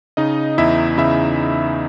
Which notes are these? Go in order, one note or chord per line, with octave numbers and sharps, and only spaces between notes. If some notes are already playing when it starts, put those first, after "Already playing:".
C#3 D#4 D#5
E2 E4 E5
C#3 E4 E5